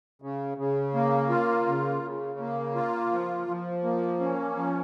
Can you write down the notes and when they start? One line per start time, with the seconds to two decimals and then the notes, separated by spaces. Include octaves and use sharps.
0.22 C#3
0.58 C#3
0.94 A#3
1.30 F4
1.67 C#3
2.03 C#3
2.39 A#3
2.75 F4
3.12 F3
3.47 F3
3.83 A#3
4.20 C#4
4.55 F3